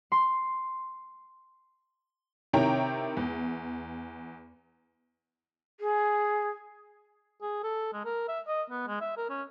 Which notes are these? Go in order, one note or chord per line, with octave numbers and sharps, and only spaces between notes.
C6
C3 D#3 E4 C#5 G5 A#5
E2
G#4
G#4
A4
G#3
A#4
E5
D#5
B3
G#3
E5
A#4
C#4